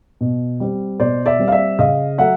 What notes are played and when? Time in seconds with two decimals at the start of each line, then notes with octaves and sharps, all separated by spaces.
0.21 B2
0.60 G3 C4
0.99 B2 C5 D5
1.26 D5 E5
1.39 G3 C4
1.48 F5
1.52 D5 E5
1.79 C#3 D#5 F5
2.18 F#3 A3 E5 F#5